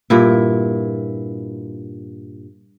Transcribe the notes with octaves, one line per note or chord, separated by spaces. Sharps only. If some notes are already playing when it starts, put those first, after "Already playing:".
G2 A#2 E4